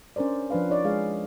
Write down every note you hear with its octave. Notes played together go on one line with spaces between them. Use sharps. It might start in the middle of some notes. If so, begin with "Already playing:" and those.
C#4 D4 A#4 C5 D5
F3 D4 B4 F5
D#4 C#5 D5
G#3 G#4 F5